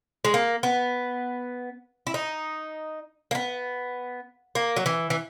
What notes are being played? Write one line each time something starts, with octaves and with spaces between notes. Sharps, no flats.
G#3
A#3
B3
E4
D#4
A#3
B3
A#3
F#3
E3
E3